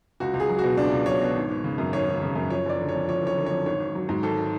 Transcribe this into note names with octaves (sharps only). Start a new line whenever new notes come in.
C#2 F#4
C#2
G#4
F#3
F#4
B2
C#2 D4
C#2
F#3 C#5
B2
G#1
G#1
C#3
F#2
G#1 C#5
G#1
C#3
F#2
F3 C#5
F#1 D5
D3
C#5
F2
F3 C#5
F#1 C#5
D3
F2 C#5
G#1 C#5
G#1
F#3
G#2
G#1 A4